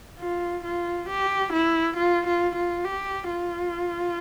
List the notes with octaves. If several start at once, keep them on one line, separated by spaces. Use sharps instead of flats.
F4
F4
G4
E4
F4
F4
F4
G4
F4